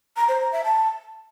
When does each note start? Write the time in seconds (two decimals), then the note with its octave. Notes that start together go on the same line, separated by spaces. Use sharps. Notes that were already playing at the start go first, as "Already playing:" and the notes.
0.17 A#5
0.28 C5
0.40 A#5
0.52 E5
0.64 A5